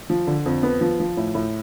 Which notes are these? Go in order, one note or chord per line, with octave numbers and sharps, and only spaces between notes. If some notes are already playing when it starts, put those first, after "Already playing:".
F3
D3
F2
B3
F3
F3
A2
A2